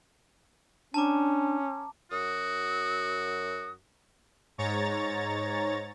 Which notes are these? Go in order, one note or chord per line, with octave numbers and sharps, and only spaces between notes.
C#4 D4 A5 A#5 D6
F#2 F#4 D#6
G#2 C#5 A#5 A6